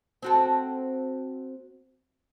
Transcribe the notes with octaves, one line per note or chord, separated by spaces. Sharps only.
C4 F#4 A4